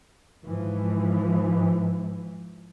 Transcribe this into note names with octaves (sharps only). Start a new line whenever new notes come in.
G#2 E3 F3